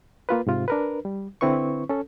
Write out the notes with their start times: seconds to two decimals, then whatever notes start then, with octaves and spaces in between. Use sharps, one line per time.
0.29 A#3 F4 B4
0.47 G#2 C3 F4
0.68 D4 A#4 B4
1.05 G3
1.41 D3 C4 E4 B4 C#6
1.89 C#4 A4